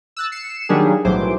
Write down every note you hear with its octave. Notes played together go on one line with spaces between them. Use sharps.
E6 F#6 A6
C7 C#7 E7
D#3 F#3 G3 A#3 D4 G#4
B1 A2 E3 F#3 C5 D6